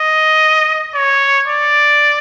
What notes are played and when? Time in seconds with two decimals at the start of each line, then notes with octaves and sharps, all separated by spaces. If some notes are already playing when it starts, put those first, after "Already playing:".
Already playing: D#5
0.95 C#5
1.48 D5